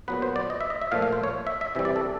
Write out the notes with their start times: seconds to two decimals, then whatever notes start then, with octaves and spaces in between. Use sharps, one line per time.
0.08 A#2 F#3 B3 B4
0.22 C5
0.36 D5
0.50 D#5
0.61 E5
0.70 D#5
0.81 E5
0.92 A#2 F3 A3 F5
1.02 F5
1.12 C5
1.24 C#5
1.47 E5
1.61 E5
1.75 C3 E3 G3 E5
1.85 D5
1.96 A4